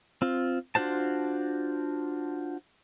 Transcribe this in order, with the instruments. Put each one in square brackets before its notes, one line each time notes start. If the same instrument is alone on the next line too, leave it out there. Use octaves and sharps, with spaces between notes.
[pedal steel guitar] C4 F4
D4 F4 F#4 C5 A5